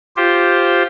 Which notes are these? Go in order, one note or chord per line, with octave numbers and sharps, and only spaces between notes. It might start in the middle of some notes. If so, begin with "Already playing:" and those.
F4 G4 C5